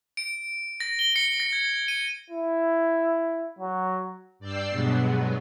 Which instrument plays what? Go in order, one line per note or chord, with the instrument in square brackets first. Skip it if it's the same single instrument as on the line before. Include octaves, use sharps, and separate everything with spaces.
[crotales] D7
A#6
G7
C#7
A#6
G#6
D#7
[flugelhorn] E4
F#3
[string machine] G2 D5 G5 E6 C7
G2 B2 F#3 G#3 B3